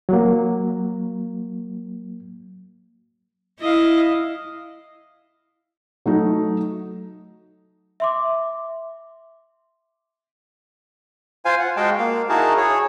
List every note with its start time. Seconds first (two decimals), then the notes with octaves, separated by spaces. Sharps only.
0.09 F#3 A#3
3.61 E4 D#5 F5
6.06 F#3 A3 D#4
8.00 E5 C6 D6
11.45 F4 C5 F5 G#5
11.59 F#5
11.77 G#3 F#4 D#5 F5 G5 A5
11.98 A#3 F5
12.29 D#4 E4 F#4 G#4 A#4 A5
12.57 G#4 C#5